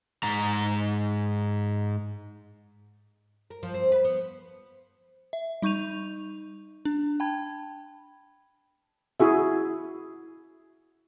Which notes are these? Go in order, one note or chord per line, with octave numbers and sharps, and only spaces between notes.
G#2 A#5
A#4
F3
C4
B4
B3
E5
G3 D#4 C#6 G6 D#7 F7
D4
G5 A5 B5 G#6
E4 F#4 G#4 E5